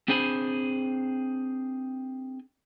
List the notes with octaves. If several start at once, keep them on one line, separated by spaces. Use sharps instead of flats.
C4 D4 G#4 C5 G#5 B5